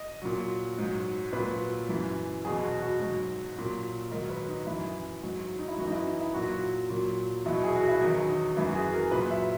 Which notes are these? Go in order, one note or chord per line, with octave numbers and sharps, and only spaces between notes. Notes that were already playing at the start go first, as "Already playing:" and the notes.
Already playing: D#5
A#2 F#3
G#2 F#3
A#2 F#3 B4
F#2 E3
E2 B2 F#3 G#4
F#4
F#4
G#2 F#3
A#2 F#3
G#2 D#3 F#3 A#4
B4
D#4
F#2 E3 E4
G#2 F#3
D#4
E4
F#2 E3 F#4
D#4
E4
D#4
E4
A#2 F#3 F#4
A#2 F#3
E2 B2 F#3 E4
G#4
F#4
E4
E2 D#3 F#3 D#4
D#4
F#2 E3 E4
F#4
G#4
A#4
A#2 F#3 B4
E5